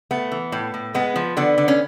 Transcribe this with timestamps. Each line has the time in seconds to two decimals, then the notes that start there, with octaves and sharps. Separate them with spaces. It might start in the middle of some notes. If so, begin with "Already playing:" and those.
0.11 A3 B3
0.32 E3
0.52 A2
0.74 A2
0.94 G#3 B3
1.16 F3
1.37 D3 B3
1.58 D3
1.68 C#4